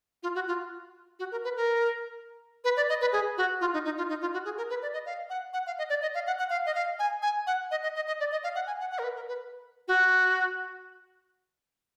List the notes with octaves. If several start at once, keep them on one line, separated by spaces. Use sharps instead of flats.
F4
F#4
F4
F#4
A#4
B4
A#4
B4
D5
D#5
B4
G#4
F#4
F4
D#4
D#4
F4
D#4
F4
F#4
G#4
A#4
B4
D5
D#5
F5
F#5
F#5
F5
D#5
D5
D#5
F5
F#5
F#5
F5
D#5
F5
G#5
G#5
F#5
D#5
D#5
D#5
D#5
D5
D#5
F5
F#5
G#5
F#5
F#5
A#4
B4
A#4
B4
F#4